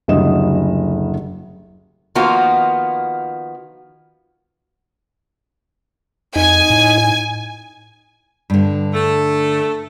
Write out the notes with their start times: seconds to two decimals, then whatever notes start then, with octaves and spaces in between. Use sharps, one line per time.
0.08 F#1 D2 F#3 G3 D#5 E7
2.15 D#3 F3 A#3 B3 F4 F#4
6.36 F2 D#4 G#5
6.70 A2
8.50 G2 D3
8.93 A3 A4